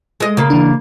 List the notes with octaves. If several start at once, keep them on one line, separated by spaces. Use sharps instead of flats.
G#3 D#5
C#3 A#3
E3 D4